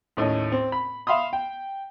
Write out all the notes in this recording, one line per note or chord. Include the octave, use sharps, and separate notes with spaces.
D#2 A2 C#4 D#5
C4
B5
E5 F5 B5 C6 D#6
G5